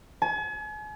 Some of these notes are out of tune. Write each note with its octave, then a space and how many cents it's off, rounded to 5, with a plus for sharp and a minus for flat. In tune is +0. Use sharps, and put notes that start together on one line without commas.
G#5 +40